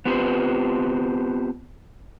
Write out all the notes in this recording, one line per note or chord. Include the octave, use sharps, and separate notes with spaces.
B3 C4 F4 G4 B4 C5